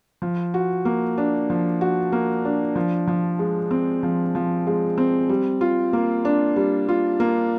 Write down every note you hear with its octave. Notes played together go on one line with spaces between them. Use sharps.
F3
F#4
A#3
D4
F3
F#4
A#3
D4
F3
F3
G#3
C4
F3
F3
G#3
C4
G3
F4
A#3
D4
G3
F4
A#3